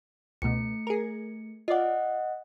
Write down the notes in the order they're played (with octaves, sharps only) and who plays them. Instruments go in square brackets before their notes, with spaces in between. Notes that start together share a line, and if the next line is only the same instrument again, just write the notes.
[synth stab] C#2 B2 [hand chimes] A3 C#7
[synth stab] G#4 A#4
[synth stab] F4 D5 [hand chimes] D#5 F#5